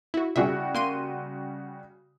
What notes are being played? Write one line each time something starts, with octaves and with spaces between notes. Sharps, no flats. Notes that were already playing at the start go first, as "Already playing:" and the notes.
E4 F#4
C#3 G3 F#4 G#4 E5
A#3 C6 D#7